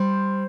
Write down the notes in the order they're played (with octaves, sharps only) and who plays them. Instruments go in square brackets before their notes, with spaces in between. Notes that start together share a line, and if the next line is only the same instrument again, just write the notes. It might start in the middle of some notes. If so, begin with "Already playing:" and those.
Already playing: [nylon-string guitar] G3 [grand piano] C5